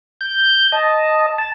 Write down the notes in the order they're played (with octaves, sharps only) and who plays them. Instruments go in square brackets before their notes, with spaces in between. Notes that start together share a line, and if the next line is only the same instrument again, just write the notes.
[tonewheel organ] G6
[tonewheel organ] D#5 [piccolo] A5
[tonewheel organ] A5